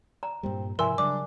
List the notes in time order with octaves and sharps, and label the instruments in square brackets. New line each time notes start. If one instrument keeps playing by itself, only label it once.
[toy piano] A#5
[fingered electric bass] G2 A#2 G3 [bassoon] C4
[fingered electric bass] G#2 C3 F3 [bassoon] E4 [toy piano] A#4 G#5 [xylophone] C6 E6
[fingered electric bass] C#3 F#3 G3 [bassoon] D4 [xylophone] D6